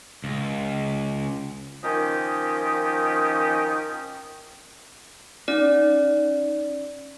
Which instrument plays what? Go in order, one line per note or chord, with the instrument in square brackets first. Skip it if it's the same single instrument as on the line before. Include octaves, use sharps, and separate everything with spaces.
[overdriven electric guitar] C#2
[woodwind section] D#3 F3 C#4 G4 D#5
[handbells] C#4 D#4 D5